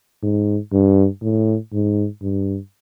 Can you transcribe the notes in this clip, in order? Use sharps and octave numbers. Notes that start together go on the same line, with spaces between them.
G#2
G2
A2
G#2
G2